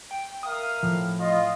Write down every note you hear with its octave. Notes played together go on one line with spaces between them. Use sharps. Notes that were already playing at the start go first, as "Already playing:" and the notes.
G5
A#4 E5 F5 D#6
A2 F3
F4 D#5